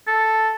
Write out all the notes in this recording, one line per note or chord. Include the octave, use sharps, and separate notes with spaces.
A4